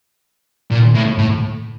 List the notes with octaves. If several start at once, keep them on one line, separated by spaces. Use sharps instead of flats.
A#2
A2
A2